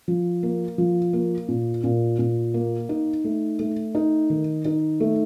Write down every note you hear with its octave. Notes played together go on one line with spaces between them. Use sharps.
F3
A#3
F3
A#3
A#2
A#2
A#2
A#3
D#4
A3
A3
D#4
D#3
D#4
A3